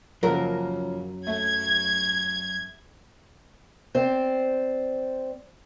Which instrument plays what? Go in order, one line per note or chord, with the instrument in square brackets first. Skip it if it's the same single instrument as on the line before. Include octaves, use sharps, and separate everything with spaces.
[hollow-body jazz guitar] F#2 F#3 [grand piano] C#3 F3 A#3 [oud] A#4
[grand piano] A3 [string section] G#6
[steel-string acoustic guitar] C4 C5 D5